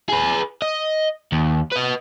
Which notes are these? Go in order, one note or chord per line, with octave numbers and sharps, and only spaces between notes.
G#4 B4
D#5
D#2
B4 D#5